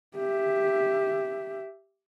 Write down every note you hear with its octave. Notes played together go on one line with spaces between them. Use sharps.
G4 E5